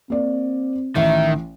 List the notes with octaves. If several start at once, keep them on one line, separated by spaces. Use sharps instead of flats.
A#3 C4 D5
A1 D#3 E5